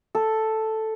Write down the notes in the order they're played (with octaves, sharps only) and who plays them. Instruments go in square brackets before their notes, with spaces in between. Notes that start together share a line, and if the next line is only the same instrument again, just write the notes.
[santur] A4